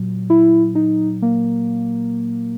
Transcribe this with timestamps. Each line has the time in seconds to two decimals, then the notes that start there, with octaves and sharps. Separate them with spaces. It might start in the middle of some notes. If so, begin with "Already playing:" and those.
Already playing: A#2 F#3
0.30 E4
0.75 D#4
1.22 A#3